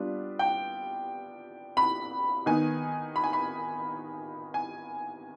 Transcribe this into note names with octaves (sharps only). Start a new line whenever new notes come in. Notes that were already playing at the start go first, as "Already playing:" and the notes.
Already playing: G3 B3 D4 F4
G5
B5
D#3 B3 D#4 G#5
B5
G#5
B5
G#5